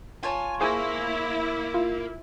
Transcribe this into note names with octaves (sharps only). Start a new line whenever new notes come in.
F4 C#5 G#5 A5
E4 G#4 A#4 C5 F5 G#5
F4